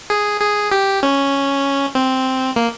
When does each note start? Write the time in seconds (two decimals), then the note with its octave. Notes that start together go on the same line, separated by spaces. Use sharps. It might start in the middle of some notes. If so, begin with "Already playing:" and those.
0.10 G#4
0.41 G#4
0.71 G4
1.03 C#4
1.95 C4
2.56 A#3